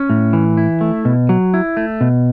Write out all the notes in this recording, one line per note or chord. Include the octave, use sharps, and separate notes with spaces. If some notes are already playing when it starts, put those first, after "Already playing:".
Already playing: C#4
A2
E3
E4
A3
B2
F#3
E4
A3
B2